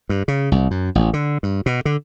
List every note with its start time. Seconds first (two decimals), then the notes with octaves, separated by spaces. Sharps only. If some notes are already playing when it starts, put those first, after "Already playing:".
0.09 G2
0.28 C#3
0.52 C2
0.71 F#2
0.95 A1
1.13 D3
1.43 G2
1.66 B2
1.85 D3